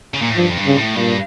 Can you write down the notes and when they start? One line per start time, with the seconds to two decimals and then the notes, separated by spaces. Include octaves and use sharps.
0.14 C#3
0.22 A#2
0.29 A2
0.36 G2 F3
0.50 F2
0.57 G2
0.66 C#3
0.77 A2
0.96 G2 A#2